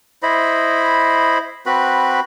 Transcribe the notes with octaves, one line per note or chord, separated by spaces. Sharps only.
E4 C5 D#5 B5
C4 F#4 B4 B5